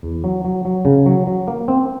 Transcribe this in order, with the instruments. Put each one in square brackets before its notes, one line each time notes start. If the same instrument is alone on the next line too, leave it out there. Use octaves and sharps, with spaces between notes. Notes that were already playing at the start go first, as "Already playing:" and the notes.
[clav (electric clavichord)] E2
F#3
F#3
F#3
C#3
F#3
F#3
A#3
C4